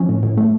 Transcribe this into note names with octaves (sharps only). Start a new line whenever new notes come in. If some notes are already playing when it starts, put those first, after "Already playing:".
Already playing: F3 C#4
A2
A2
A3